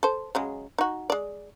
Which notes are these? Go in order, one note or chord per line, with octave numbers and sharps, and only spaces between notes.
A4 C5
C#3 F#3 G#3
D#4 F#4
G#3 D5